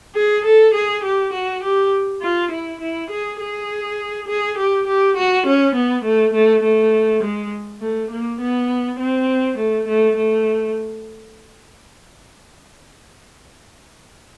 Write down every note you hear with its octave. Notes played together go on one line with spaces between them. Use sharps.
G#4
A4
G#4
G4
F#4
G4
F4
E4
E4
G#4
G#4
G#4
G4
G4
F#4
C#4
B3
A3
A3
A3
G#3
A3
A#3
B3
C4
A3
A3
A3